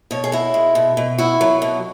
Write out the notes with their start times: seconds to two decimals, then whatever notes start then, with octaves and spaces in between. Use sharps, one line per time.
0.11 B2 C#5
0.24 G#4
0.32 E4 F#4
0.54 G#3
0.75 B2
0.97 B2
1.18 E4 F#4
1.41 F#3
1.62 B2